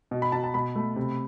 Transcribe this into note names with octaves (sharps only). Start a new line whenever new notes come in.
B2
B5
B2 A5
A5
B2 B5
A3
C3